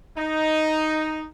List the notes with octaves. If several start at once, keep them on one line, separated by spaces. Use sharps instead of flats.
D#4